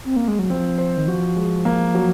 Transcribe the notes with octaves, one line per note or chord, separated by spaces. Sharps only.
C4
A#3
G#3
F#3
F3 C4
C5
D#3
F3 F#4
G#3
A#3
F#3